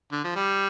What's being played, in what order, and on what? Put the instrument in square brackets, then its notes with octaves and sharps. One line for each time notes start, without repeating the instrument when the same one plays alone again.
[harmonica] D3
F3
G3